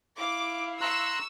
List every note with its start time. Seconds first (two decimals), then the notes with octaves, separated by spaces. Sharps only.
0.18 E4 F5 D6
0.81 A#5 C6 C#6 E6 F#6